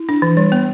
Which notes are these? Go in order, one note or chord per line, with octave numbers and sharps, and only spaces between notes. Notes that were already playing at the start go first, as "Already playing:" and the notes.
Already playing: E4
D4
E3
G3
B3